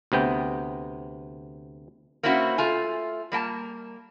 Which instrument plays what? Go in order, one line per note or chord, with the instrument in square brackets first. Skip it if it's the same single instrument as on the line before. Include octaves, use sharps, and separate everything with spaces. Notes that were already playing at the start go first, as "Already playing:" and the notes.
[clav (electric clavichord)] D2 C3 B3 G5
[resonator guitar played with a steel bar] A#3 C4 C#4 E4 F#4
A3 F4 G#5
G3 A#3 G5 A5